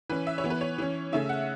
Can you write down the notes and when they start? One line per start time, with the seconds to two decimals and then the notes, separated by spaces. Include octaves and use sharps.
0.10 E3 C#4 B4
0.27 E5
0.38 C#5
0.44 E3 B3
0.50 B4
0.61 C#5
0.78 E3 C#4
1.12 C#3 A3 C#4 E5
1.29 F#5